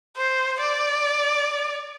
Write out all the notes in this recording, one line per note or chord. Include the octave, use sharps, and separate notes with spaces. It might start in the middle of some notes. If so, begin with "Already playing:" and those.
C5
D5